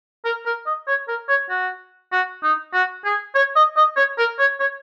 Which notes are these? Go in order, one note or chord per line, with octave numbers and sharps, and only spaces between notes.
A#4
A#4
D#5
C#5
A#4
C#5
F#4
F#4
D#4
F#4
G#4
C#5
D#5
D#5
C#5
A#4
C#5
C#5